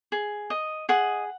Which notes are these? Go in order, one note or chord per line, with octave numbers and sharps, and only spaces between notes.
G#4
D#5
G#4 D#5 F#5